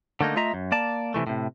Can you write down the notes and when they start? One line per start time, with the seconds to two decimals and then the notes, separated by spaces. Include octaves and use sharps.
0.21 D3 A3 A#3 D#4
0.36 A3 F4 D#5 E5 A#5
0.54 F#2
0.72 A#3 D5 A5
1.14 C3 D#3 E3 A3
1.27 A2 C3